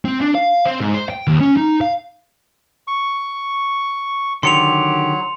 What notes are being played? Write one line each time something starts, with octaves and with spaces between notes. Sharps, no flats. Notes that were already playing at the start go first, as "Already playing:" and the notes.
C4
D4
F5
C4
G#2
C5
G5
D#2
C#4
D#4
F5
C#6
D3 D#3 F#3 G4 C6 C#7 F7